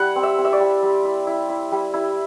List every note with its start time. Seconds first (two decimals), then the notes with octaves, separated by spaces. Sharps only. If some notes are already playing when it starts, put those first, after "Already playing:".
Already playing: G3 E4 F#5
0.16 C4
0.23 E5
0.38 C4
0.45 E5
0.53 D5
0.60 G3
0.83 G3
1.05 E4
1.27 E4
1.49 E4
1.72 G3
1.94 E4